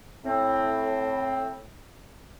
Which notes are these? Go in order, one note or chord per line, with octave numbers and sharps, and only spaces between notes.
A2 C4